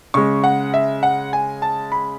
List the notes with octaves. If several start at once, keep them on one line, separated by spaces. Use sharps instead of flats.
C#3 G#3 C#6
F#5
E5
F#5
G#5
A5
B5